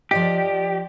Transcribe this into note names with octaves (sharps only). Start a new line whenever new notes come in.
F3 G4 D5 D#5